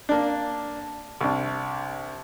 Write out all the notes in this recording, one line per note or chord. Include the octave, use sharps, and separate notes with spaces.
A#3 D4
C2 D4